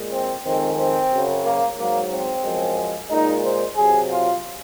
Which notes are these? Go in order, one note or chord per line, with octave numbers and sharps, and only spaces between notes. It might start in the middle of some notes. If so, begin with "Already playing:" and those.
Already playing: A#2 G#3
C4
F2 D#3 G#3 C4
C4
F#2 C#3 F#3
A#3
G#2 F#3 A#3
C4
F#2 F3 G#3
A#2 G#3 D#4
C5
C3 F#3 G#4
F4